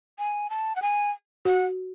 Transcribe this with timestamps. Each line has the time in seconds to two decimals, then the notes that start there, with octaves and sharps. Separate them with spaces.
0.18 G#5
0.50 A5
0.76 F#5
0.82 G#5
1.45 F#4 F#5